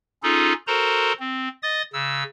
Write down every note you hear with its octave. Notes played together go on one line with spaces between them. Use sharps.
C#4 D#4 F4 G#4 A4
F#4 A4 A#4 C5 A#5 C6
C4
D#5 D#6 A6
C#3 E6